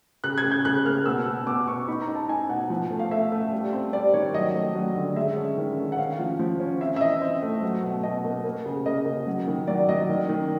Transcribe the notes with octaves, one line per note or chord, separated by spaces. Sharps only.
C#3 F#6
G#6
C#3
G6
C#3 F#6
A#3 F6
B2 E6
B2
B2 D6
B2 C#6
D#4 B5
A#5
D#4
A5
D#4 G#5
B2 F#5
F3
A3
F5
A3 E5
A3
G3
C4
G3 D5
D#3 C#5
F#3 D#5
A3
F#3
D3
G#3 E5
C#4
D#3
D#3
F#5
C#4 F5
F3
F3
C#4
C4 E5
E5
E3 D#5
C4
A3
F#3
B2
B2 D#5
A#3
A#3
C#3
A#3 D#5
C#3
F#3
D#3
F#3 D5
F#3 D#5
D#3
D#3